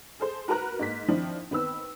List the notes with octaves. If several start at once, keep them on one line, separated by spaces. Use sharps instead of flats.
G#4 A4 C5
F#4 A#4 B4 A#5 F#6
G#2 A#3 B6
D#3 F3 C4 D4 E4
D#3 B3 C4 E6